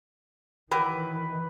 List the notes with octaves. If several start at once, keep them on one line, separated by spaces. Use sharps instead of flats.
D#3 E3 F#3 G4 A#4 B4